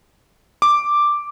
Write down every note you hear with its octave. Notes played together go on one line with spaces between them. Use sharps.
D6